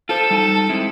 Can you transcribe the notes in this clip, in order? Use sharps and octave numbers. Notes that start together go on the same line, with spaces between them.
F4 A4 C5
G3 D#4 A5
G#3 C4 E4